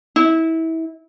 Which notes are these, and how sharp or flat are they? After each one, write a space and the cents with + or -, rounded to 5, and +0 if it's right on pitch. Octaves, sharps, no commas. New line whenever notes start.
E4 -25